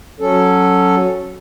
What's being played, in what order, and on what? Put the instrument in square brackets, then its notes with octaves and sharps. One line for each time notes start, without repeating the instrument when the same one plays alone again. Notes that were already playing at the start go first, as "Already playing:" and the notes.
[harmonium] F#3 C#4 A4